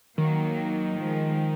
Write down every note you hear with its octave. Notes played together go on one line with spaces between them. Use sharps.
D#3 F#3 A#3
F3 G#3